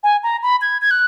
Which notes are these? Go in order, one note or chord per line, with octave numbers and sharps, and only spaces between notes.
G#5
A#5
B5
G#6
G#6
F#6